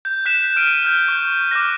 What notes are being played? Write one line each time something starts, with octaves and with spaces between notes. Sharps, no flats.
G6
F#6 B6 E7
F6 D7 D#7
F6 G6
C#6
D6 F6 F#6 A#6